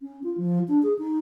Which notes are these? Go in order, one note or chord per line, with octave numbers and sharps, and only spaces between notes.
C#4
F4
F3
D4
G#4
D#4